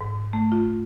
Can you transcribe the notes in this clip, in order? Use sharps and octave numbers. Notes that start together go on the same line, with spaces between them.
G#2
A3
F4